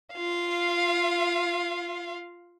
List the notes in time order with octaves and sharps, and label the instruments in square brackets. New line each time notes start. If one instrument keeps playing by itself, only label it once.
[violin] F4 F5